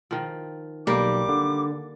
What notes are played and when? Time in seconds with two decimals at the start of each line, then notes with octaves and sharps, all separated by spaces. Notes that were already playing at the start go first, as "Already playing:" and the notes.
0.11 D#3 F3
0.87 B1 G3 A#3 G4 D6
1.29 D3